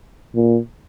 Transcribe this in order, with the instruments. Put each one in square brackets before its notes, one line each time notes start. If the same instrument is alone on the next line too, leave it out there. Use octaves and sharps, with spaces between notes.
[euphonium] A#2